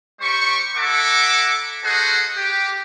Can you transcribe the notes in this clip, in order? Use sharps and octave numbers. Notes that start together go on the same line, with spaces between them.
G3 G4 C5 C#6
E4 A4 E5 F#5 A#5 D6
F#4 G#4 A4 C5 D#5 F#5
G4